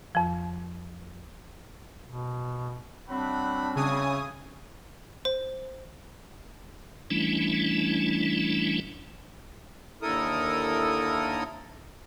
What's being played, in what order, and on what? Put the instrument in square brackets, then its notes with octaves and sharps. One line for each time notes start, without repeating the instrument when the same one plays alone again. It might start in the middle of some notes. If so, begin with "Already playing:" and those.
[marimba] F2 F3
[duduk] B2
[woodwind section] F#3 G3 C4 [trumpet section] A3 F#5 B5 [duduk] D4
[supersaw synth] C#3 G#5 D#6 [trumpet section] E4 G#4 C#5
[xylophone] C5
[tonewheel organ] E3 G3 A3 C#4 D4 E4
[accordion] D#2 D3 E4 A4 A#4 D#6